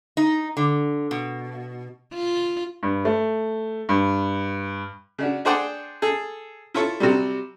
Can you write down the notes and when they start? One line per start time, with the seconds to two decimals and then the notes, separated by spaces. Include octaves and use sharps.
0.17 D#4
0.57 D3
1.11 B2
2.14 F4
2.83 G2
3.05 A3
3.89 G2
5.18 C#3 D4 F#4
5.45 D4 G#4 C5 D5 F#5 G5
6.02 G#4 A4
6.74 E4 F4 A4 C#5
7.00 C3 F#3 G3